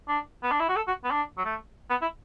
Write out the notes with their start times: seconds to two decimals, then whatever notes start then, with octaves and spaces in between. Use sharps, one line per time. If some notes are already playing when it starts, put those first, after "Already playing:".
0.08 D4
0.43 B3
0.51 D4
0.60 E4
0.69 F#4
0.76 A4
0.88 F#4
1.04 B3
1.11 D4
1.38 F#3
1.45 A3
1.90 B3
2.02 E4